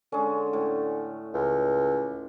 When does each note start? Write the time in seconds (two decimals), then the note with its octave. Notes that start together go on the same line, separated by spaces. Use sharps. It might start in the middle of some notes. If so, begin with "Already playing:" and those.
0.12 D3 G#3 C#4
0.53 A2
1.34 C#2